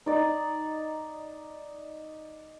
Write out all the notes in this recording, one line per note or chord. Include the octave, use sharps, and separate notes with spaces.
D#4 D5